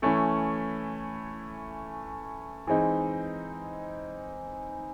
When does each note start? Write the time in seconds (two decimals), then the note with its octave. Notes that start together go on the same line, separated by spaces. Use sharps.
0.02 E3 A3 C#4 E4
2.67 E3 G#3 C4 D#4